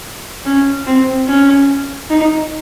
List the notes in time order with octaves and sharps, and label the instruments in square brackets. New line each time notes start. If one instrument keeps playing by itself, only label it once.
[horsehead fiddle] C#4
C4
C#4
D#4